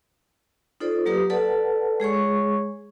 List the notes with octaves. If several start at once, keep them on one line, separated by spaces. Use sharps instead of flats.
D#4 F4 A4 C5 D5
F#3 A#3 G4 B4 D#6
A4 B4 D5 F#5 A5
G#3 G#4 C#5 C#6